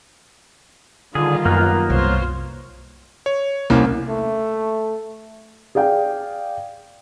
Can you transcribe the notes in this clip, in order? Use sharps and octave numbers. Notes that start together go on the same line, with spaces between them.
D3 D#3 G3 F4 G#4
F#2 A#3 B3 A#4
C2 F4 C5 C#5
C#5
C2 A#3 C#4
A3
G#4 D5 F5 G5